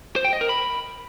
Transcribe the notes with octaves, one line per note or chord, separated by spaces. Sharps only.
C5
G5
D#5
A#4
B5